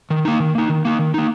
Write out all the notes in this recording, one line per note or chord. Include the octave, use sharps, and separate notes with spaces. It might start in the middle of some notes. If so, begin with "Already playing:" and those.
D#3
A#3 D#4
D#3
A#3 D#4
D#3
A#3 D#4
D#3
A#3 D#4